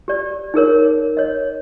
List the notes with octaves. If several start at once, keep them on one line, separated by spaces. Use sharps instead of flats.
G4 D5
D#4 G#4 A#4 C#5
C#5 D#5